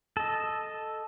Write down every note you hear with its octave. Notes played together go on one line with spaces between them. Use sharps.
A4 D#5